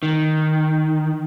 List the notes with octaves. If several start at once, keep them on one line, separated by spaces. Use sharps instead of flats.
D#3